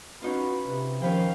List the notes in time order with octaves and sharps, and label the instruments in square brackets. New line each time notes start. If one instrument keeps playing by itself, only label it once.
[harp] C#4 D#4 F4 [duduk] F#4 [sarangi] B4
[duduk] C3
[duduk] D#3 [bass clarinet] F3 [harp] C#4 B4 G5 [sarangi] F5